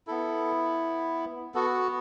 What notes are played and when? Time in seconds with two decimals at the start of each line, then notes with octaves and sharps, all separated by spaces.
0.07 B3 E4 A4
1.55 B3 F#4 A4